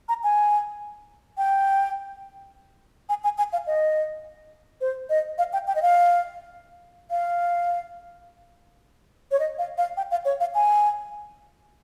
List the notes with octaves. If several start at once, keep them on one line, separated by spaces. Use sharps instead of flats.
A#5
G#5
G5
G#5
G#5
G#5
F5
D#5
C5
D#5
F5
G5
G5
D#5
F5
F5
C#5
D#5
F5
F5
G5
F5
C#5
F5
G#5